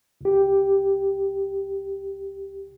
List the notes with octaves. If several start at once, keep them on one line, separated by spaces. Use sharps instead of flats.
C#2 G4